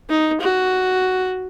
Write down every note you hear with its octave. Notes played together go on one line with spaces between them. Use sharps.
D#4
F#4